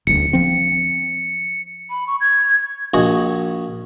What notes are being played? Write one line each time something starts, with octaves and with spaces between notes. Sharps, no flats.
D#1 D2 C#7
F3 C4
B5
C#6
G#6
A#1 F#4 D#5 G#5 C#6